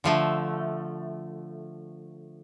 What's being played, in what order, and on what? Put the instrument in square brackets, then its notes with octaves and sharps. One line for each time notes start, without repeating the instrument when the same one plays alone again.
[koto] D3 F3 A3